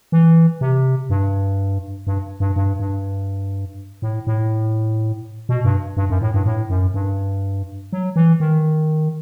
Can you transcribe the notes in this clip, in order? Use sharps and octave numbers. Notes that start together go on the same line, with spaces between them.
E3
C3
G2
G2
G2
G2
G2
A2
A2
B2
G2
G2
F#2
A2
G2
A2
F#2
G2
F#3
E3
D#3